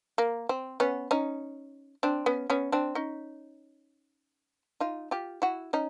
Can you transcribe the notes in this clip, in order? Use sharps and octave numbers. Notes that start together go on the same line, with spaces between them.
A#3
C4
B3 C#4
C#4 D#4
C4 D4
B3 C#4
B3 C#4
C4 D4
C#4 D#4
D#4 F4
F4 G4
E4 F#4
C#4 D#4